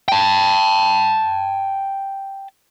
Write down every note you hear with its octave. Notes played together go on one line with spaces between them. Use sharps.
G5 A5